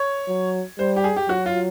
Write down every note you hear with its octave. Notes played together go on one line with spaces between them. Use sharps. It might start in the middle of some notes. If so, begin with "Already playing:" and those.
Already playing: C#5
F#3
G3 C5
G4
G#4
G4
F#3 F#4
F4